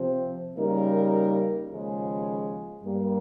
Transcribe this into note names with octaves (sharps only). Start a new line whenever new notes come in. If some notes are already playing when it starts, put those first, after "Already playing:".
Already playing: C3 F3 C4
C#3 G3 A#3 D#4 A#4
D#2 C#3 F3 G#3
G2 G3 A#3